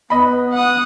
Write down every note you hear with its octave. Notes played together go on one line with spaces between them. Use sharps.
B3 D#5 B5
F#5 D#6